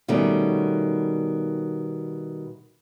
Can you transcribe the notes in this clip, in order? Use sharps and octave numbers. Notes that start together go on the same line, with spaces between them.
B2 D#3 G3 A3 C#4